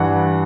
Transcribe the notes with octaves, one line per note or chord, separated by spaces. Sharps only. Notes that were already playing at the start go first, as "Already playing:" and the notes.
Already playing: G2 E3 F#5